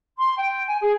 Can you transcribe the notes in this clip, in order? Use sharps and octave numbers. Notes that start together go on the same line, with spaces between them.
C6
G5
G#5
G#4